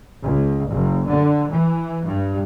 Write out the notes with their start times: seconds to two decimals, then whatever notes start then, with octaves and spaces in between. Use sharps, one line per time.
0.21 C#2
0.69 F#1
1.07 D3
1.50 E3
2.05 G2